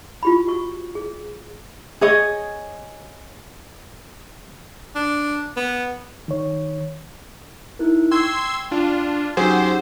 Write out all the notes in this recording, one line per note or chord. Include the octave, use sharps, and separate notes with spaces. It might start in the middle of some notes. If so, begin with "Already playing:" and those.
F4 G4 B5
F#4 C#6
G#4
G#4 C#5 D#5
D4
B3
D#3 C#5
D#4 E4 A#4
G5 C6 C#6 E6 G#6
D4 F4
F#3 C#4 D#4 G4 G#4 C5 F#5